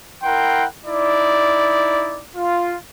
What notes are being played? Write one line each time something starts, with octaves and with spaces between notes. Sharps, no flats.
E4 A#4 F#5 G5 C6
D#4 E4 D5
F4